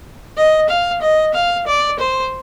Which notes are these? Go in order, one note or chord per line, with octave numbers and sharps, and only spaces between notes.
D#5
F5
D#5
F5
D5
C5